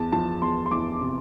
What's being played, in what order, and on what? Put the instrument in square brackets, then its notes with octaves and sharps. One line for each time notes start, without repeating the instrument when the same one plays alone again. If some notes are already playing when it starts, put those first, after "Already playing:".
Already playing: [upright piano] E2 A5
F3 A5
E2 C6
C6
E2 D6
C3